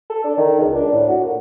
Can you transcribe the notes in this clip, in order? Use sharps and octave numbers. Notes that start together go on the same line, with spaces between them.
A4
D4
D#3
C#2
D4
A2
F#4
A#2